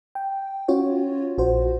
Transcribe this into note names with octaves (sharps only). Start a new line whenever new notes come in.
G5
C#4 F4 F#4 C#5
A#1 F#4 C5